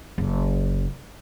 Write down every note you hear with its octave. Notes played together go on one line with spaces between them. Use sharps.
F#1